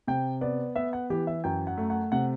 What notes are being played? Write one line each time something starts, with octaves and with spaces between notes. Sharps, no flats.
C3 G5
B3 D5
B3 E5
F#5
E3 G4
E5
F#2 G5
F#5
A3
F#5
C3 F#5